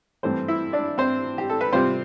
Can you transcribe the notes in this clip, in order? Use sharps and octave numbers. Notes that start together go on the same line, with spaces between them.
G2 E3 A3 C4 C5
E4 E5
D4 D5
C4 C5
G4
A4
B4
C3 G3 C4 F4 C5